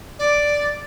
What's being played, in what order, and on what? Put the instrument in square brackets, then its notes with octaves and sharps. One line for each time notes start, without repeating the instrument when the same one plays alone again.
[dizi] D5